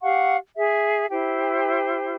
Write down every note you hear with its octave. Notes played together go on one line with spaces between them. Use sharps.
G4 F5 F#5 C#6
G#4 E5
E4 G4 C5